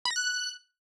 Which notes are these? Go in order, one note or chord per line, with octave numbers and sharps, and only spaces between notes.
B5
A#6
F#6